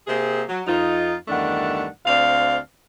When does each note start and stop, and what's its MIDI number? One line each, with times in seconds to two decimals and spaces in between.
0.07 0.41 48
0.07 0.41 58
0.07 0.41 60
0.07 0.41 68
0.49 0.61 54
0.66 1.14 41
0.66 1.14 63
0.66 1.14 65
1.28 1.86 40
1.28 1.86 43
1.28 1.86 51
1.28 1.86 57
1.28 1.86 62
1.28 1.86 78
2.06 2.57 38
2.06 2.57 60
2.06 2.57 74
2.06 2.57 77